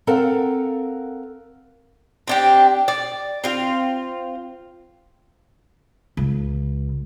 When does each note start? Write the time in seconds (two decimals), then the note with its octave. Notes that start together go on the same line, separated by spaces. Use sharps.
0.07 C4 A4 A#4 F5 F#5
2.28 C4 D4 G4
2.88 D5
3.44 C4 F4
6.17 C#2